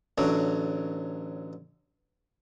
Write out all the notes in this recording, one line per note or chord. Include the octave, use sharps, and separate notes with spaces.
A1 D3 F#3